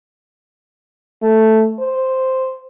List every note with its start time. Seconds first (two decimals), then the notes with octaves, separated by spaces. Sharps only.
1.22 A3
1.79 C5